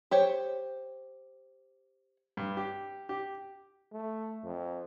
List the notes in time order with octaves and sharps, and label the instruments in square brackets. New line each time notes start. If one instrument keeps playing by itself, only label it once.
[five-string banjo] G4 C5 C#5
[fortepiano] G2
G4
G4
[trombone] A3
F2